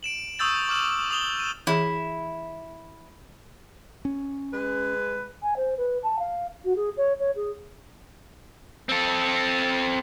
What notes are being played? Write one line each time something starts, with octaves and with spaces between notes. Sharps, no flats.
D7 E7 F#7
C#6 D#6 E6 G6 A6 F#7
C#6 D6 F6 E7 F#7
D#6 F7 G7
D#7 E7
E3 E4 G#4
C#4
G#3 B4
G#5
C5
B4
A5
F5
F#4
G#4
C#5
C#5
G#4
C4 A4